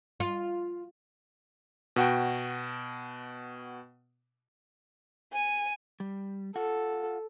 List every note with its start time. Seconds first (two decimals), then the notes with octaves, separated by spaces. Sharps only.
0.20 F4
1.96 B2 F#4 G5
5.32 G#5
6.00 G3
6.56 F4 A4 F#5